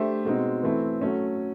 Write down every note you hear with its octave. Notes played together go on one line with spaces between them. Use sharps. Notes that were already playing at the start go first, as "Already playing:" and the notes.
Already playing: A3 D4 G4 C5 E5
B2 G#3 C4 D#4
E3 A3 C4 E4
F#3 A3 C#4